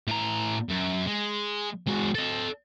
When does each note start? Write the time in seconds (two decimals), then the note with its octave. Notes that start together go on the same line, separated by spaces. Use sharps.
0.08 A2 A#5
0.69 F#2
1.07 G#3
1.87 G#3 F#4
2.15 A4 D#5